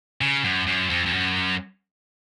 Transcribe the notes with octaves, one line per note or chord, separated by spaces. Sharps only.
C#3
F#2
F#2
F2
F2
F#2